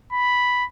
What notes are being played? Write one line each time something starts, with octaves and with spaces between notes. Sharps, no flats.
B5